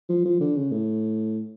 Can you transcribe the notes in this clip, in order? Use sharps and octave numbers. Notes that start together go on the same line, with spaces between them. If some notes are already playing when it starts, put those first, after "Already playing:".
F3
F3
D3
C#3
A2